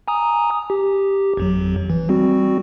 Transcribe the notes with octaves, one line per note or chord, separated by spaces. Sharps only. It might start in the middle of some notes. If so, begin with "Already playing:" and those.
G#5 A#5 D#6
G4
G#1 F2 F#3
E3
G3 C4 F#4